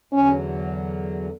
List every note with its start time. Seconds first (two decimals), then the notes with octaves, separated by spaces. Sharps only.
0.12 E2 D3 F#3 C#4